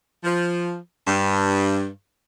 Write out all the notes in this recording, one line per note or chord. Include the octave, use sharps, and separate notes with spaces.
F3
G2